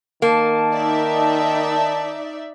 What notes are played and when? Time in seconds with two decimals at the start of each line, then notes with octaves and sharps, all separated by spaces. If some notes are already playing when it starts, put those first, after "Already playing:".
0.22 D#3 A#3 A5
0.73 D#4 D5 E5